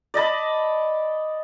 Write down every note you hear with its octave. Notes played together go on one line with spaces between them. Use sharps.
D5 D#5 A5 B5